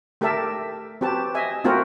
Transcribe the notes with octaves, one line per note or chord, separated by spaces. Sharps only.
A3 G4 A4 A#4 E5 A5
C4 F#4 G4 B4 A5
D#5 E5 G#5
A3 C4 F4 F#4 A#4